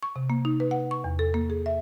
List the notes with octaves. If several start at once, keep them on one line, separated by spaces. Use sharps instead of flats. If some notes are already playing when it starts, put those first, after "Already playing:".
C#6
C3
A#3
D#4
B4
F#5
C#6
E2
A4
A#3
G#4
E5